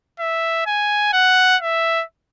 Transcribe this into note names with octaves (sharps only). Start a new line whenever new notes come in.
E5
G#5
F#5
E5